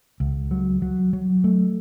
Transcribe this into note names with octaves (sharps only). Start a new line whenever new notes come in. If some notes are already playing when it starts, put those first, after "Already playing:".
C#2
F#3
F#3
F#3
A3